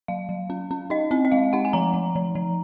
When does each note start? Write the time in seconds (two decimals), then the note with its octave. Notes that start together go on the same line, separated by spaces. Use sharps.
0.08 F#3 F5
0.29 F#3
0.50 C#4
0.71 C#4
0.90 D#4 D#5
1.11 C4 D#5
1.25 D#5
1.32 G#3 F5
1.53 D#4 F#5
1.65 G#5
1.73 F3 A#5
1.94 F3
2.16 F3
2.35 F3